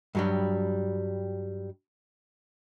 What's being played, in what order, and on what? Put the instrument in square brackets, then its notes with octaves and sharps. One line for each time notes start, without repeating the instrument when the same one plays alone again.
[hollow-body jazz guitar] G2 F#3 G3